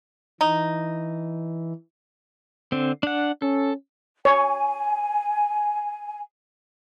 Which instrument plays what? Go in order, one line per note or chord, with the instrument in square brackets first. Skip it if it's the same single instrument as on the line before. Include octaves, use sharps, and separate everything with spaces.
[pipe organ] E3 [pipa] D#4
[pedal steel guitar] D3 C4
D4 F#5
[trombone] C#4 [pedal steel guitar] A4
[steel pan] C#5 [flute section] G#5